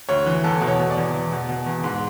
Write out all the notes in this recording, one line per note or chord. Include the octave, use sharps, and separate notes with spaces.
D2 C#5
E3
E2 A4
B2
C#5
B2
D5
E2
E2
B2
B2
E2
G#2